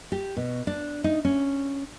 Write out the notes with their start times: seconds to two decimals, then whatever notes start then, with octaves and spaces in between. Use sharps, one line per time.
0.12 G4
0.37 B2
0.67 D4
1.04 D#4
1.25 C#4